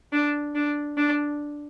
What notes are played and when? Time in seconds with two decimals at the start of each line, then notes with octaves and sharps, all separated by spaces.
0.12 D4
0.55 D4
0.97 D4